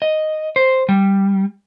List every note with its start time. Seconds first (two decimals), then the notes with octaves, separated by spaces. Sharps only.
0.02 D#5
0.56 C5
0.89 G3